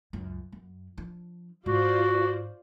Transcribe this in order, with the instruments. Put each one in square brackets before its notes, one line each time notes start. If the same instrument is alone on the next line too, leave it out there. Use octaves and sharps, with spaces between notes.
[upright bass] C#2 F#2
F#2
F3 D4
[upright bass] G#2 [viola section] F4 C5 D5 [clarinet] F#4